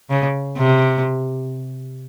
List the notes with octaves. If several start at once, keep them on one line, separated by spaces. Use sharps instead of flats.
C#3
C3